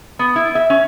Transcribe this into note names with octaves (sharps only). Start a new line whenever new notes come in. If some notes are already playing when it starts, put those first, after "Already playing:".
B3
E4
E5
C#4